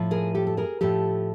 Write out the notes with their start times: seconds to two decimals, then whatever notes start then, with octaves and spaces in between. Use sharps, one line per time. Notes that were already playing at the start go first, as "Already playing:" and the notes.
Already playing: A2 F3
0.11 G#4 A#4
0.35 G4 A4
0.47 A4
0.57 G#4 A#4
0.81 A2 F3 G4 A4